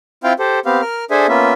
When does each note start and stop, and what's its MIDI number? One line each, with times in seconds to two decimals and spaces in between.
0.24 0.33 60
0.24 0.33 64
0.24 0.33 65
0.24 0.33 77
0.24 0.33 79
0.39 0.59 67
0.39 0.59 69
0.39 0.59 72
0.66 0.81 59
0.66 0.81 60
0.66 0.81 67
0.66 0.81 77
0.82 1.05 70
0.82 1.05 89
1.11 1.27 62
1.11 1.27 68
1.11 1.27 69
1.11 1.27 72
1.11 1.27 76
1.11 1.27 80
1.28 1.54 58
1.28 1.54 59
1.28 1.54 61
1.28 1.54 65
1.28 1.54 76